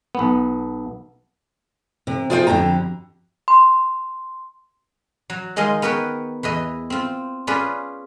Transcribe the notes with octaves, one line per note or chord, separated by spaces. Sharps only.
B1 B3
C3
F4 G#4 C5 F5 G5
F2 G#2 D3 G4 A#5
C6
F#3
D#3 G#3 G#4 D#5 F5 C6
B3 A#4 B4 C#5 G5
E2 E3 D#5
C4 F4
C#4 F4 G#4 B4 C#5 D5